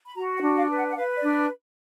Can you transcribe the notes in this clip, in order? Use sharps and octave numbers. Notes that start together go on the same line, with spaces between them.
B5
F#4 A#5
F#5
D4
F5
B4
F#5
F#5
B4 F5
D5
D4